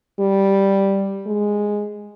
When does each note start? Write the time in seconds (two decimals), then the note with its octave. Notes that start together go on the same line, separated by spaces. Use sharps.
0.20 G3
1.26 G#3